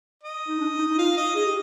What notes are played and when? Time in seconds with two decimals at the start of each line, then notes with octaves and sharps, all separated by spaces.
0.23 D#5
0.48 D#4
0.60 D4
0.79 D#4
0.90 D#4
0.98 F4 F5
1.17 D#5
1.35 G#4 D#5
1.46 G4